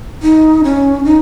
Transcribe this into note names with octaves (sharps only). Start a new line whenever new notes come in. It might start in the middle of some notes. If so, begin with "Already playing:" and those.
D#4
C#4
D#4